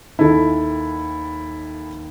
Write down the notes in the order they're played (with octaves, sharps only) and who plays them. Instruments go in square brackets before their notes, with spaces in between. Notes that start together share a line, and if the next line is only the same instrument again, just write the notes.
[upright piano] D#2 D#3 [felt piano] E4 A4